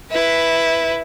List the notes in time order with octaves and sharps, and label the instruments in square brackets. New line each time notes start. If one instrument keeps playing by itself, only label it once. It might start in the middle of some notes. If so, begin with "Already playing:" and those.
[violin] E4 B4